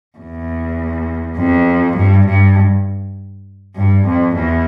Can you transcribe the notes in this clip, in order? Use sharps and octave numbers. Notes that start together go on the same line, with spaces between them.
E2
F2
G2
G2
G2
F2
E2